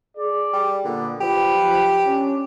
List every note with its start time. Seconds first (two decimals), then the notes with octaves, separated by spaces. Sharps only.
0.17 G#4 D5
0.53 G3
0.85 A#2 D3 B3
1.21 F3 G4 B4
2.07 C#4 D4